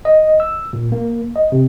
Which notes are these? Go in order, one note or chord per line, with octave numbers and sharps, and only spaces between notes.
D#5
E6
A#2
A#3
D#5
C3